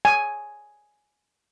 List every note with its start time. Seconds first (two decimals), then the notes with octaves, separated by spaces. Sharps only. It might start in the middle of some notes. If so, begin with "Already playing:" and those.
0.05 G#5